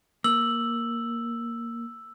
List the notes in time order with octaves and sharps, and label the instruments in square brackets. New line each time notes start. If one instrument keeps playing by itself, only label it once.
[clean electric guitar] A#3 [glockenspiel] E6 F#7